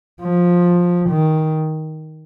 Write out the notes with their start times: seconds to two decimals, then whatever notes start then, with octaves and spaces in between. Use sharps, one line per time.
0.22 F3
1.10 D#3